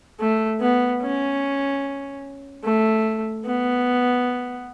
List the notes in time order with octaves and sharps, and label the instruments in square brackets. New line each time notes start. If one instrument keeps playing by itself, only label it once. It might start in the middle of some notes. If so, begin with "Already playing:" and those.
[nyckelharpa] A3
B3
C#4
A3
B3